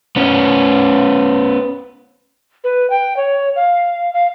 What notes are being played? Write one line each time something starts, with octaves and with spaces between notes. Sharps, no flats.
B3 C#4
B4
G5
C#5
F5
F5